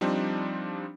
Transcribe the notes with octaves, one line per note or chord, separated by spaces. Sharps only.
F3 G3 C4 D4 D#4